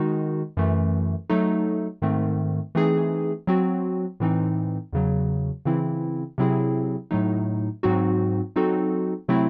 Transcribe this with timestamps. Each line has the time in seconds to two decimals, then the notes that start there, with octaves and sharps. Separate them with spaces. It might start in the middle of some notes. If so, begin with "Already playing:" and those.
Already playing: D#3 G#3 D#4 F#4
0.57 F#2 E3 A3
1.30 F#3 A3 D#4 A4
2.02 G#2 D#3 A3 C4
2.75 E3 A3 C4 D#4 G#4
3.47 F#3 C4 F#4
4.20 A2 E3 C4 D#4
4.93 E2 C#3 F#3
5.65 C#3 E3 C4 E4
6.38 C3 F#3 C4 E4 G#4
7.11 A2 F#3 A3 D#4
7.83 G#2 F#3 C4 D#4 F#4
8.56 F#3 C4 D#4 F#4 A4
9.28 C3 F#3 A3 C4 E4